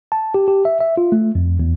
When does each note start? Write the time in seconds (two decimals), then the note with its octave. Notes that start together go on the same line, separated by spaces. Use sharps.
0.12 A5
0.34 G4
0.48 G4
0.65 E5
0.80 E5
0.97 F4
1.12 A3
1.35 F2
1.60 E2